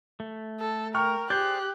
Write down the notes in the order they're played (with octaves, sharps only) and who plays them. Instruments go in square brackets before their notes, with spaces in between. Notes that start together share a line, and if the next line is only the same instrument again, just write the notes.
[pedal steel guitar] A3
[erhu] A4
[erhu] A#4 [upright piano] G5 C#6 F6
[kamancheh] G4 [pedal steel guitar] G#4 C5 D5 [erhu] F#6 [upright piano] G6